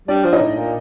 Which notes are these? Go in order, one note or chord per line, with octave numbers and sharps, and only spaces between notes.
G3 D4 D5
F3
D#4 D#5
A2
A#2